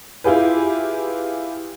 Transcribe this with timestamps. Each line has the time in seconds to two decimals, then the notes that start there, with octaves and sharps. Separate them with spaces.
0.24 E4 F4 G4 G#4 B4